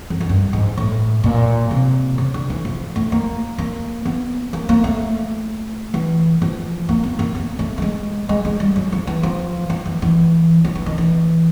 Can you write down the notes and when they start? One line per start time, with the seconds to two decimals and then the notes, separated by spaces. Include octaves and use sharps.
0.10 F2
0.20 F#2
0.29 G2
0.53 G#2
0.78 A2
1.24 A#2
1.71 C3
2.18 C#3
2.34 D3
2.50 E3
2.65 F3
2.96 A3
3.12 A#3
3.58 A#3
4.05 B3
4.53 A#3
4.69 A#3
4.84 A3
5.94 E3
6.42 F3
6.89 A#3
7.03 B3
7.19 A#3
7.35 B3
7.59 A3
7.78 A3
7.82 G#3
8.29 G#3
8.45 G#3
8.60 G3
8.76 F#3
8.92 F3
9.07 E3
9.23 F3
9.70 F3
9.85 E3
10.02 E3
10.65 F3
10.75 E3
10.86 D#3
10.98 E3